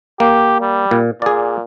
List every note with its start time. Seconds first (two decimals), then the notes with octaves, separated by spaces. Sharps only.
0.20 A#3 G4
0.61 G3
0.91 A#2
1.22 A#2 G#4 D5